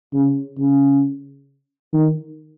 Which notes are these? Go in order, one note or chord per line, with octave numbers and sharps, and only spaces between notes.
C#3
C#3
D#3